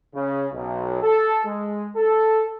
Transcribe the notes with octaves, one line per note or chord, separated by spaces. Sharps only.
C#3
B1
A4
G#3
A4